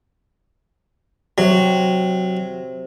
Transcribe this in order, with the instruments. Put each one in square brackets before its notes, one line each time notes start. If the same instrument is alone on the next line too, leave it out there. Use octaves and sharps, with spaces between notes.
[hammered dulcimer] C3 [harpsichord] F#3